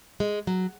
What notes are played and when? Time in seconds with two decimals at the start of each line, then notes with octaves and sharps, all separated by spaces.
0.20 G#3
0.47 F#3